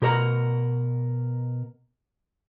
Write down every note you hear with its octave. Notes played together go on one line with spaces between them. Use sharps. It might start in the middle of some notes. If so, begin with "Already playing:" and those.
B2 G4 A#4 C#5 F#5 A#5